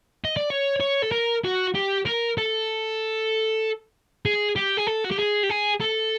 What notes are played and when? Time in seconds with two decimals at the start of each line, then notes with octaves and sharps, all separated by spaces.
0.25 D#5
0.37 D5
0.50 C#5
0.81 C#5
1.02 A4
1.12 A#4
1.44 F#4
1.75 G4
2.06 A#4
2.38 A4
4.26 G#4
4.56 G4
4.77 G#4
4.87 A4
5.05 F#4
5.11 G4
5.19 G#4
5.44 G4
5.50 G#4
5.81 A4